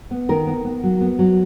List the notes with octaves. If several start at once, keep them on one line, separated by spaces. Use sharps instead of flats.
B3
D#3 A#4
B3
B3
F#3
B3
F#3